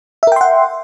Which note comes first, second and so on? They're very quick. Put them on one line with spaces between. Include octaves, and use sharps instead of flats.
E5 A#4 G5 C6 F#5